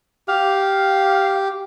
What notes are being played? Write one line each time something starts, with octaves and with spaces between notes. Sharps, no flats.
G4 F5